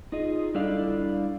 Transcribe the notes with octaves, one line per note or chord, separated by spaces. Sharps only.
D#4 F4 G#4 D#5
G3 D4 E4 A4 D5 F5